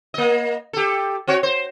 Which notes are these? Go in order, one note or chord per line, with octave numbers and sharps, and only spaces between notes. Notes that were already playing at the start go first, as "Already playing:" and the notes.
A#3 D#5
G4 A4
C4 F#4 C#5
C5